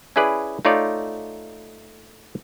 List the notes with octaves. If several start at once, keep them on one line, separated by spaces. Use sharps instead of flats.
C#4 E4 G#4 B4 D5
A3 D#4 F4 C#5 D5